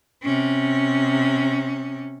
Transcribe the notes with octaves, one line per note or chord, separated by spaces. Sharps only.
C3 C#4